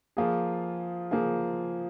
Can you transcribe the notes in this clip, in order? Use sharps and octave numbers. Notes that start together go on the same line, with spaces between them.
F3 A#3 F4 G#4
F3 A#3 F4 G#4